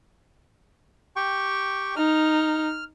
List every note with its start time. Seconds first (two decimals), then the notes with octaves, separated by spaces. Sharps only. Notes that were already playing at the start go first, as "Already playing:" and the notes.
1.16 G4 G5 C#6
1.97 D#4 F6